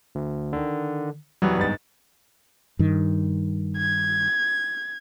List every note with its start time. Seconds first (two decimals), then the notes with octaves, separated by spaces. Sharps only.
0.15 D2
0.53 D3 D#3
1.42 D#1 E3 F#3 G3 B3
1.58 G1 G#2 A6
2.79 G2 D#3
3.77 G#6